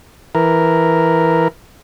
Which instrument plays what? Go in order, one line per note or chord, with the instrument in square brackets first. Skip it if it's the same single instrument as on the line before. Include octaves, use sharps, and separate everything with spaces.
[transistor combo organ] E3 A#4